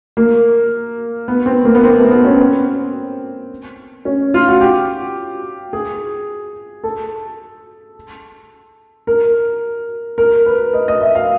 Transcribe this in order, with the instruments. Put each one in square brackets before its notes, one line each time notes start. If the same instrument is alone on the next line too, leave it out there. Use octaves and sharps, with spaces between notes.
[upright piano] A#3
B3
C4
A#3
B3
C4
A3
B3
C#4
C4
C#4
F4
F#4
G4
G#4
A4
A#4
A#4
B4
D#5
D#5
E5
F5